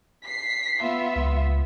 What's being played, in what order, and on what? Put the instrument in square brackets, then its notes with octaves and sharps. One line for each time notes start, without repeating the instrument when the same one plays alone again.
[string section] B6 C7
B3 F4 E5
[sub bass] C#2